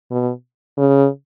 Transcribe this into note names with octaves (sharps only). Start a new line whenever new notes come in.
B2
C#3